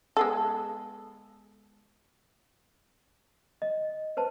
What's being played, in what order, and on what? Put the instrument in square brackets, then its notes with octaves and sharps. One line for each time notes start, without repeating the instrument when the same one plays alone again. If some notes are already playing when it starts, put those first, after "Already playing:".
[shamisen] G#3 B3 A4
[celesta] D#5
B4 C5 A5